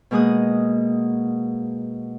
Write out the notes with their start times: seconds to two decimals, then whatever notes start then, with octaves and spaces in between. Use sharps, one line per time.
0.11 B2 G#3 A#3 G#4 D#6 F#6